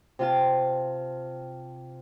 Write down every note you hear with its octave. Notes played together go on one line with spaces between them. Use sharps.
C3 F4 A5